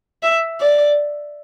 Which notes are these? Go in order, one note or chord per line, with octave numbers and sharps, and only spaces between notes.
E5
D5